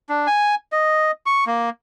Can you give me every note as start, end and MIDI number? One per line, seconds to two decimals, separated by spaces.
0.09 0.27 62
0.27 0.55 80
0.72 1.11 75
1.26 1.44 85
1.47 1.70 58